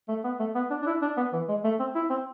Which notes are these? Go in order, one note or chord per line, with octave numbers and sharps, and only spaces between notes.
A3
B3
A3
B3
D4
D4
E4
D4
B3
E3
G#3
A3
C4
E4
C4